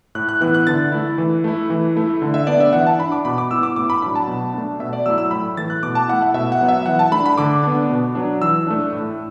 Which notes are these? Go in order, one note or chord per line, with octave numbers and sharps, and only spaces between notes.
A2 F#6
F#6
E3 B3 E4 F#6
F#6
D3 A6
A3 E4
E3
A3 E4
E3
A3 E4
D3
E5
B3 D4 D5
E5
E3 F#5
A5
D4 B5
D6
B2 B5
D6
B3 E4 E6
D6
A2 D6
B5
F#3 D4 B5
A5
B2
A3 D4
B2 E5
D5
F#3 A3 E4 E6
E6
A2 B5
E3 A3 A6
F#6
B2 D6
A5
A3 E4 F#5
E5
B2 E5
F#5
F#3 B3
E5
E3 F#5
A5
A3 D4 B5
B5
D3 D6
B3 D4
B2
F#3 D4
E3 E6
A3 D4
A2